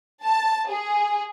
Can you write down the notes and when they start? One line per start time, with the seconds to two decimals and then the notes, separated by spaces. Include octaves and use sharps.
0.23 A5
0.69 G#4